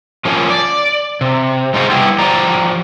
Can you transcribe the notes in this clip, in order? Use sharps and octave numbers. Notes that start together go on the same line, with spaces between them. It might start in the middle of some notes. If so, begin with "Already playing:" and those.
F3 A#3 C#4
D5
C3
G#3 D#4 F4 F#4 C5
G3 B3 D4 E4 G4
F3 G4 D5 A#5